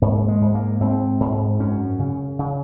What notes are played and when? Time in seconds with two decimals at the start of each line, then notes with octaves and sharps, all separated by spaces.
0.02 G#2 A#3
0.28 G#3
0.41 G#2
0.55 A#3
0.81 G#2 C4
1.20 G#2
1.60 F#2 C#4
1.99 C#3
2.39 C#3